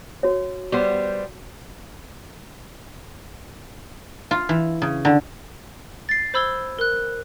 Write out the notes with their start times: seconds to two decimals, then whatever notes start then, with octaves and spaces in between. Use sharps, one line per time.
0.23 F#4 C#5
0.72 G3 B3 C5
4.31 F4
4.49 E3
4.82 C#3
5.05 D3
6.09 A6 C7
6.34 C5 B5 E6 G#6 G7
6.79 A#4 F#6